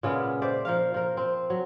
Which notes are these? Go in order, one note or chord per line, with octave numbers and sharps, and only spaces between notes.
A#2 C#3 G#3 B3
C5 D5 E5
F3 A#4 F5
F3 A#4
C4
F#3